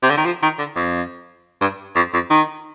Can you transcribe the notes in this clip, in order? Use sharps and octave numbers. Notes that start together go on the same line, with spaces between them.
C3
D3
D#3
F3
D#3
D3
F2
G2
F2
F2
D#3